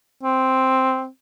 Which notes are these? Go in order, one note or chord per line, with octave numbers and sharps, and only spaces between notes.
C4